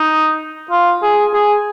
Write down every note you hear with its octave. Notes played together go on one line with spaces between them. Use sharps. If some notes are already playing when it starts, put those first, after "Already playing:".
Already playing: D#4
F4
G#4
G#4